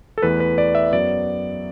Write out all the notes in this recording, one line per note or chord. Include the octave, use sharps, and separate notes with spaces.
A4
E2 E3 A3 B4
B4
D5
E5
F#2 F#3 B3 D5